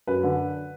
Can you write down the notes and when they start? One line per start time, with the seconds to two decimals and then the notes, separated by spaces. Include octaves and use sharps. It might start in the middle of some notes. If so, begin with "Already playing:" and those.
0.07 F#2 B4
0.23 D3